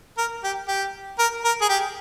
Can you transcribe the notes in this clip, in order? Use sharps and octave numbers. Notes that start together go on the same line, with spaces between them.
A#4
G4
G4
A#4
A#4
G#4
G4